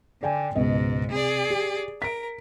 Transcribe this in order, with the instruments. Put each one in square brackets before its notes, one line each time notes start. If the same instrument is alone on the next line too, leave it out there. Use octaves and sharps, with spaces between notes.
[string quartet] D3 [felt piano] D5 G5 G#5
[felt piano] C#2 B2 D#5 [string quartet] G#2
[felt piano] C3 [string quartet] G#4 D5
[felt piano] G4
[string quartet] A#4 [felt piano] B6 D7